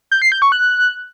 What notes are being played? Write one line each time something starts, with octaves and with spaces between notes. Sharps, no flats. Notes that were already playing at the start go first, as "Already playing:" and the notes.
G6
C7
G6
C#6
F#6